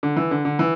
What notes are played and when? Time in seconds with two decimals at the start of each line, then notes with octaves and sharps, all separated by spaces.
0.03 D3
0.17 E3
0.31 D3
0.45 D3
0.59 E3